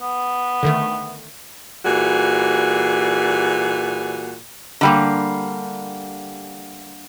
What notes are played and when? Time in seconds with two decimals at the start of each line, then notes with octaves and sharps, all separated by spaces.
0.01 B3
0.63 D3 D#3 A3
1.85 A#2 E3 G3 F#4 G#4
4.81 D3 G3 A#3